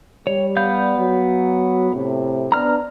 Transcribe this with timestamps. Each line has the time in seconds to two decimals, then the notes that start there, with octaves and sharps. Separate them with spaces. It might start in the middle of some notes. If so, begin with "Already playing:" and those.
0.27 G3 C#5
0.57 B3 F5 G6
0.98 F#3
1.92 A2 C3
2.52 B3 D4 A#5 F6